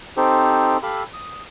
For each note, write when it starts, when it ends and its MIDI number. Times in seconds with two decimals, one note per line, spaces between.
0.17 0.77 60
0.17 0.77 63
0.17 0.77 67
0.17 0.77 69
0.17 0.77 72
0.83 1.03 67
0.83 1.03 69
0.83 1.03 77
0.83 1.03 83
0.83 1.03 88
1.13 1.42 87